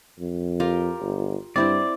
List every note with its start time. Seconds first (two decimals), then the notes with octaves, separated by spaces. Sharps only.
0.20 F2
0.60 F4 G4 A#4
1.01 G1
1.56 G2 C4 E4 C5 D5